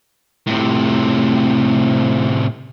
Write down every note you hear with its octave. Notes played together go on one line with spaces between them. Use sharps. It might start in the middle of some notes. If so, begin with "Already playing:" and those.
A2 C3